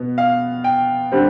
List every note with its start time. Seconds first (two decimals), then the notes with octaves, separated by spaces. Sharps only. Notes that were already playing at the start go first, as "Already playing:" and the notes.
Already playing: B2 B3
0.18 F5
0.64 G5
1.12 D3 G3 C4